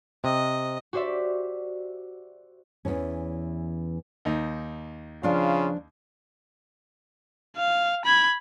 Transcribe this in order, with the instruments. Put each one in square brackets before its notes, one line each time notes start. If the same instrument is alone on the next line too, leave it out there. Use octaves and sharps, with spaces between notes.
[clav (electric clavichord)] C3 [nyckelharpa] D#5
[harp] F#4 G4 C5 D5 E5
[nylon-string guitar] E2 G#2 E3 C#4
[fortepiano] D#2 D#4
[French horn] C#3 [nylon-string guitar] F3 D4 F5 [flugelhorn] F4
[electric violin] F5
B5 G#6